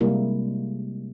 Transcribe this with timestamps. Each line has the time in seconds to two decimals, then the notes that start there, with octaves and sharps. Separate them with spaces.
0.01 C3 G3 G#3 A#3 E4